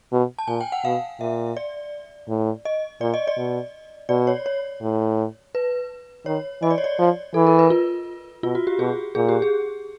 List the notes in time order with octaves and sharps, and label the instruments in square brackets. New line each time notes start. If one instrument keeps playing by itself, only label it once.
[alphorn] B2
[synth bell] A5
[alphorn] A#2 [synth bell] G#5
[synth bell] G5
F#5
[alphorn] B2 [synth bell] F5
[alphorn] A#2 [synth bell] E5
[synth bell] D5
[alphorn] A2
[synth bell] D#5
[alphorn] A#2 [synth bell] D5
[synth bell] D#5
D5
[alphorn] B2
[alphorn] B2 [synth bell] D5
[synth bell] C#5
C#5
[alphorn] A2
[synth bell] B4
[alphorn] D#3 [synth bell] C#5
[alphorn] E3 [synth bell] D#5
[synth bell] D5
C#5
D5
[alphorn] F3
[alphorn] E3 [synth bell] A4
[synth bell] A#4
B4
F4
[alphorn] B2 [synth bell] F4
[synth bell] F#4
G4
[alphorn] B2 [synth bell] G#4
[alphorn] A#2 [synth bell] G#4
[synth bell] G4
G#4